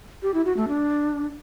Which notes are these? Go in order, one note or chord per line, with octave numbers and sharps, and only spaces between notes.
G4
E4
F#4
A3
D4